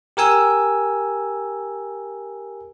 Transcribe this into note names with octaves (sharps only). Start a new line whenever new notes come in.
G4 A#4 G#5 E6